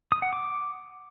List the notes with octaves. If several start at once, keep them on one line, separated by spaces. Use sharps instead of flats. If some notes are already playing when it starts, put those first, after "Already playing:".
D#6
F#5
D6